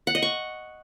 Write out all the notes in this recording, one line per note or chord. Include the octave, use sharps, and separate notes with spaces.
F#5
D#5
C#6